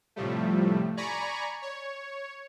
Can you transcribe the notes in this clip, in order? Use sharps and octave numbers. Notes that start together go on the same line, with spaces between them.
A2 C3 F3 G3 A3
D5 G#5 A#5 B5 C#6
C#5